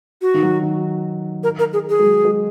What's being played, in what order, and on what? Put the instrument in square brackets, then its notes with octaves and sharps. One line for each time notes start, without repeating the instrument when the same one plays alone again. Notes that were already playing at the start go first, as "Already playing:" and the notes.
[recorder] F#4
[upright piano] D#3
F#3
D#3
[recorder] A#4
A#4
G#4
G#4
[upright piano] G#3
F#3
G#3